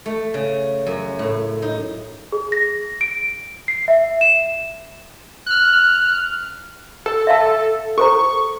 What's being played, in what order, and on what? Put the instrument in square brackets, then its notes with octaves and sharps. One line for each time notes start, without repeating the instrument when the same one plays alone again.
[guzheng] A3
C#3
F#2
A2
D#4
[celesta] G#4
A#6
D7
C7
E5
E7
[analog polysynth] F6 F#6
[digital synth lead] A4
[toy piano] E5 F5 A5
[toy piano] A4 C5 A#5 [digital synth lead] C#6